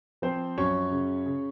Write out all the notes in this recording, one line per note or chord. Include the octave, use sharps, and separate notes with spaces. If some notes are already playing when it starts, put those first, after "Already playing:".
F3 C4 C5
F#2 C#4 C#5
C#3
C#3